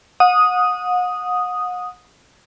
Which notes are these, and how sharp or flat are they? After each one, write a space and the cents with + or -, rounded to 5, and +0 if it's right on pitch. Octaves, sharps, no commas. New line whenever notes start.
F#5 -35 D#6 +0